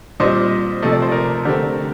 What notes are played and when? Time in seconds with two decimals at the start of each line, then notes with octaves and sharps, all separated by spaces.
0.20 A#2 G3 C4 C5 D#5
0.82 C3 F3 A3 D#5
0.92 D5
1.02 C5
1.11 A#4 D5
1.45 D3 A3 C4 G4 A#4